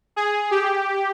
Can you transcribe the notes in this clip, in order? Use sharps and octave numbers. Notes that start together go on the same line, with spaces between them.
G#4
G4